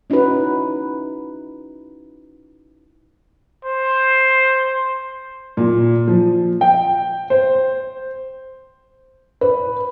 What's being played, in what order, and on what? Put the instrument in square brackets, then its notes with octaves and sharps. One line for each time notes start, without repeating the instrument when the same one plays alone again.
[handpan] C#4 D#4 E4 F#4 B4
[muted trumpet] C5
[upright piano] A#2
F3
G5
C5
[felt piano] B4